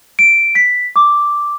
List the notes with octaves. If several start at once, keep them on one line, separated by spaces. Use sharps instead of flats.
D7
B6
D6